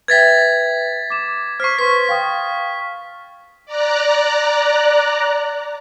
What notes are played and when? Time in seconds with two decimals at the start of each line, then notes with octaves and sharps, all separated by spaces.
0.08 B4 E5 G5 G#6 A6 B6
1.10 D6 E7
1.60 C5 C#6 F6 B6 C7
1.79 B4 C6 C#6 B6
2.09 F5 G5 D#6
3.66 D5 A#5 F#6